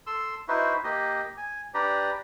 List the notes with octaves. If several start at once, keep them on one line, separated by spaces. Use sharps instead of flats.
A4 C6 E6
D#4 E4 F#4 B4 C5 E5
A#3 G4 D#5
G#5
D4 G4 B4 D5 A#5